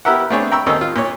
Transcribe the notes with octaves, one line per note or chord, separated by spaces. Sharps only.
B3 E4 G4 A#4 E5 F#5
A3 B3 C4 D4 G#4 C#5
G5 A#5 B5 C#6 E6
D#2 D#3 C4 C#4 A4 D#5
F4
A#2 C#5